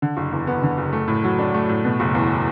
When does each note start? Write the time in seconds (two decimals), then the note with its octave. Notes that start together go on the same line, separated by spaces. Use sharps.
0.02 D3
0.17 F#1
0.32 E2
0.47 B3
0.63 D3
0.78 F#1
0.93 A3
1.08 A2
1.24 F#3
1.39 D4
1.54 A3
1.69 A2
1.85 B2
2.00 F#1
2.15 E2